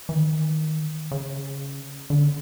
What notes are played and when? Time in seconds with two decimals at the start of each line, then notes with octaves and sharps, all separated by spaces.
0.09 E3
0.13 D#3
1.11 C#3
2.10 D3